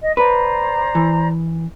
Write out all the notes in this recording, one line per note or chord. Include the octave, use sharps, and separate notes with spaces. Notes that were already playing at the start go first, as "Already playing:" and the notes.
D#5
B4 C5 D5 A#5
E3